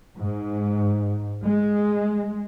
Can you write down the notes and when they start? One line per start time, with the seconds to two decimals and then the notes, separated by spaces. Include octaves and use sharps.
0.18 G#2
1.43 G#3